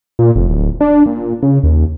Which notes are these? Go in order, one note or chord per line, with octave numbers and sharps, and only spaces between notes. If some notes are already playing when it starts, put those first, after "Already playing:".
A#2
F1
D1
D4
A#2
C#3
D#2